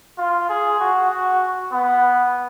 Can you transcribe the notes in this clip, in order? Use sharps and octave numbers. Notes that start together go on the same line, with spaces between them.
F4
G#4
F#4
F#4
B3